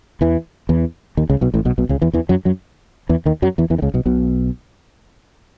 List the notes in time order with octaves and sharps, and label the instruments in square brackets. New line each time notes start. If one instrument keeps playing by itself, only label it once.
[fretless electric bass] E2 E3
E2 E3
D#2 D#3
C#2 C#3
B1 B2
A1 A2
B1 B2
B1 B2
C#2 C#3
E2 E3
E2 E3
F#2 F#3
F#2 F#3
E2 E3
D#2 D#3
F#2 F#3
E2 E3
E2 E3
D#3
C#2 C#3
B1 B2
B1 B2